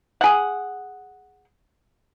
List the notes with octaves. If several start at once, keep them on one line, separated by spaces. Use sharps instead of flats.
G#4 F#5